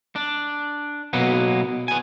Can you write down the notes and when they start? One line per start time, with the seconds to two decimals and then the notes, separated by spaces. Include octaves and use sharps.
0.16 D4
1.13 B2 F#3 A#3 B3
1.88 B3 G#5